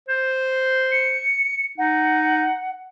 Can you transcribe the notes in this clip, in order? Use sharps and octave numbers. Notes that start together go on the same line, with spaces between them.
C5
C#7
D#4 F#5